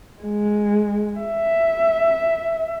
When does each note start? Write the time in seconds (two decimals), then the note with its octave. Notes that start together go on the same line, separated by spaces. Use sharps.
0.23 G#3
1.21 E5